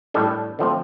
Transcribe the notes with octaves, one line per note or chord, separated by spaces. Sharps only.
A2 G3 D4 A4
D3 F3 A3 C4